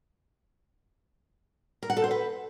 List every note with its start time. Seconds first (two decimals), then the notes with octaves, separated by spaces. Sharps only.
1.83 A#4
1.90 F#5
1.97 A4
2.04 C5
2.11 B4